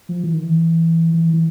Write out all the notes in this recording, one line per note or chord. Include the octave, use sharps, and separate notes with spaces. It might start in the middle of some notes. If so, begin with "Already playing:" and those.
F3
E3
D#3
E3
E3
E3